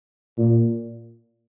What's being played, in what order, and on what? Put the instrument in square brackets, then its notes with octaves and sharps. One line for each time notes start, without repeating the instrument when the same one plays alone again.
[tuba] A#2